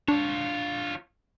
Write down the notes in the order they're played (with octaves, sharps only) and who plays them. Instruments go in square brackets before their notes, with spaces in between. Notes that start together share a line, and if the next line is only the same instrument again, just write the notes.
[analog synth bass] D4 [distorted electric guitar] F4 C#5